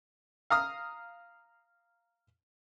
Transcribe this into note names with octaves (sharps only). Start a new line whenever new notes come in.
F5 A#5 D#6 F6